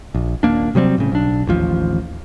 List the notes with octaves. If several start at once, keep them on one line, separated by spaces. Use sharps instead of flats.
A#1
D#1 A#3 D4
C3 F#3 G3 C4
A2 C#3
B1 D4
A1 D#2 F3